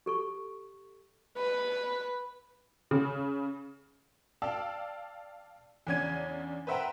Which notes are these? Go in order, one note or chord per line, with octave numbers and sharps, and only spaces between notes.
G4 A4 C#6
B4
C#3
D5 F5 G5 A5 E6
E2 C#3 C#4 D4 G#6 D#7
B4 C5 E5 F#5 G5 A#5